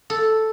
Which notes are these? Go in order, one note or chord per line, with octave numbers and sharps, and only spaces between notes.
A4